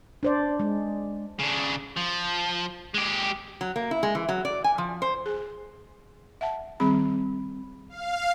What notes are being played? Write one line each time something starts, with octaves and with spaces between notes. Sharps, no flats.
D4 C5 D5
G#3
C#3 D4
F3
G#3 G4
F#3
A#3
E4
G#3
E3
F#3
D5
G#5
F3
C5
G#4 G#5
E5 F#5 A5
D#3 G3 C4 G#4 B5
F5